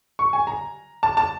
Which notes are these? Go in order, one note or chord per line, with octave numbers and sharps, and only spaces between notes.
C#6
G#5
A#5
A5
A5